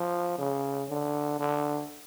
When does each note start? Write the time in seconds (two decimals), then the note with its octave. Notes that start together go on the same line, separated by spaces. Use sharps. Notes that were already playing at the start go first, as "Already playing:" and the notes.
Already playing: F3
0.39 C#3
0.89 D3
1.39 D3